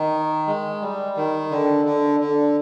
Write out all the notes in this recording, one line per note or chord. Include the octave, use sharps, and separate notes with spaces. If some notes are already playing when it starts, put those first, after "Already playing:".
Already playing: D#3
G#3
G3
D#3
D3
D3
D3